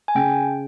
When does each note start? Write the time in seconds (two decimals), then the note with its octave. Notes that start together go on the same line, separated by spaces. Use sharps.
0.08 G#5
0.15 C#3 G5